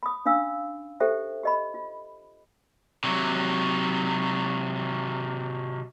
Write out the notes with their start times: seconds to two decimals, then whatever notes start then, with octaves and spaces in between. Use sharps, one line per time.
0.03 B5 D#6
0.26 C#4 D4 F5 E6
1.00 G4 A4 C5 E5 G5
1.43 G4 D#5 B5
1.74 F4
3.04 C3 F#3